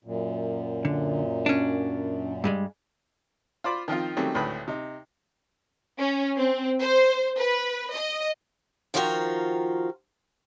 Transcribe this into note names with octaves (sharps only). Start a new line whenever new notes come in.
F#2 A#2
D3
C#4 D4
G2 G3 G#3
F4 C5 D5 B5
D#3 F3 C4 F4
D#3 F#3 G3 A3 C4 C#4
G#1 D2 A2 B4 G5 B5
C3 D#4
C#4
C4
C5
B4
D#5
D#3 F3 F4 F#4 A#4 G5